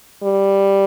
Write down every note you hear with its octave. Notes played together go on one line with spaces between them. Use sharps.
G3